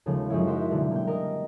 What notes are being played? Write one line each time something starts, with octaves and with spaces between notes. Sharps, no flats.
D#2 C#3 F3 G#3 A3
F#2 F3 G#3 C#4 D#4 E4
A#4 C5 E5 F#5
B2 D3 E3 G3 A#3
A#3 G5
A#4 D#5